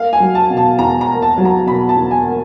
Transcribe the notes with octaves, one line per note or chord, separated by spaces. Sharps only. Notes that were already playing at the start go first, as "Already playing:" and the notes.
Already playing: A#3 F5
G#5
F#3
A5
B2
A5
E2 A#5
A#5
A#3
A5
F#3
A#5
B2 B5
A5
E2
G#5
A#3